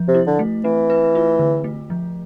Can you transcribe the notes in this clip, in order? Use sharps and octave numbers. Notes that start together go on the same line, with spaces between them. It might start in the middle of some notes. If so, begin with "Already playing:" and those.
Already playing: F3
C3
E4
D3
A3
E3 C4
B4
F4
D3
A3
F3